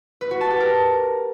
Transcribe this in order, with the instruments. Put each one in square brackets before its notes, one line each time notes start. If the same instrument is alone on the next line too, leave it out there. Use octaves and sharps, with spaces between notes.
[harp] B4
F#4
A5
G4
A#4